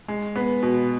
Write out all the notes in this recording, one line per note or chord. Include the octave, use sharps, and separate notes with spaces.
G#3
B3
B2